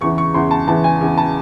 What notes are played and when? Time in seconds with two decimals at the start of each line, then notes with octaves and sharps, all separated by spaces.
0.01 E2 C#3 E3 C#6
0.18 C#6
0.34 E2 C#3 E3 C6
0.51 A5
0.67 E2 C#3 E3 A5
0.84 G#5
1.01 E2 C#3 E3
1.18 A5